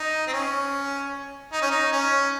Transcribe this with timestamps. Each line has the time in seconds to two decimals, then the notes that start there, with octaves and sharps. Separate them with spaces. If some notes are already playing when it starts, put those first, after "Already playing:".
Already playing: D#4
0.27 C4
0.33 C#4
1.53 D#4
1.62 C#4
1.71 D#4
1.92 C#4